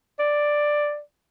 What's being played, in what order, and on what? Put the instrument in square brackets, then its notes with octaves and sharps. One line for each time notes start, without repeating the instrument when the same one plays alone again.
[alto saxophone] D5